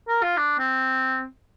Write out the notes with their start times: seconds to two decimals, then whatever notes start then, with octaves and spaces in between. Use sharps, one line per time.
0.08 A#4
0.23 F4
0.37 D4
0.59 C4